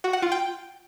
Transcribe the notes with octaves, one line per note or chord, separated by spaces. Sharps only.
F#4
F#5
F4
G5